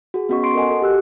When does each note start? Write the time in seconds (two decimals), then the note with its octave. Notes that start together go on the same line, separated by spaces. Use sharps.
0.14 F#4 G#4
0.29 B3 C#4 F#4 D#5 C#6
0.43 C6 C7 D7
0.55 A4 A#4 D#5 F#5 G#5
0.69 F#4 A4
0.82 G4 E6 F#6